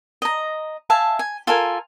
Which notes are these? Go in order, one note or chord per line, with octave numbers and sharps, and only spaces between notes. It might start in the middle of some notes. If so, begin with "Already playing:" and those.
D#5 A#5
E5 F5 G#5 A5
G#5
F4 A4 A#4 G#5